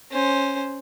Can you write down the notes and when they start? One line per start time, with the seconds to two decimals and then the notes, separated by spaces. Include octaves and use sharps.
0.11 C#4 C5